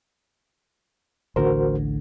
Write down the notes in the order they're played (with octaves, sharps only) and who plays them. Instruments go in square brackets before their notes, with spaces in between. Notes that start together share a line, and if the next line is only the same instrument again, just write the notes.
[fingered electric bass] A1 D2 D3 [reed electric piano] F#4 A#4 C5